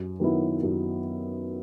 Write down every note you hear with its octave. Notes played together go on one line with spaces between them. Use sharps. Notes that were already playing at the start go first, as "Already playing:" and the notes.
Already playing: F#2
D#3 F#3 B3 E4
F#2